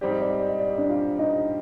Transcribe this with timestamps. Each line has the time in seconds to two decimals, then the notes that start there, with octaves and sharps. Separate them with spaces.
0.01 G#2 G3 C4 G4 D5
0.11 D#5
0.21 D5
0.30 D#5
0.39 D5
0.49 D#5
0.59 D5
0.68 D#5
0.78 D4 D5
0.90 F4 F5
1.19 D#4 D#5